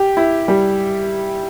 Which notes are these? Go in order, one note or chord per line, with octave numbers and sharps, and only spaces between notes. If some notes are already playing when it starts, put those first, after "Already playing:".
Already playing: G4
E4
G3